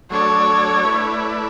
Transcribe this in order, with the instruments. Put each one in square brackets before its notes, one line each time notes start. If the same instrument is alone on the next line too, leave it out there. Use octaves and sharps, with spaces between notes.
[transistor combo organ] F#3 A3 D4 A4 D5 [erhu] C#5
[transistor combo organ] A3 E4 B4 D5